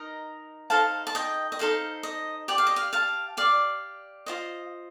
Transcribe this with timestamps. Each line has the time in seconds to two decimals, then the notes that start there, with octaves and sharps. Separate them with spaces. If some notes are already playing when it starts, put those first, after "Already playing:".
Already playing: D#4 A#4 D#5
0.70 D#4 A4 C5 F5 A5
1.07 A5
1.15 D#5 G5
1.52 D#5
1.59 D#4 A4 C5 F5
2.03 D#5
2.48 G4 D5 G5
2.58 F5
2.67 D#5
2.76 F5
2.93 F5 A5
3.37 G4 D5 F5
4.26 F4 C5 D#5